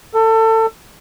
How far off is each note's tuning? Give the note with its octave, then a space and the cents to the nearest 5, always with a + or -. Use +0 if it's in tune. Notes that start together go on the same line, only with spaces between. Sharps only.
A4 +25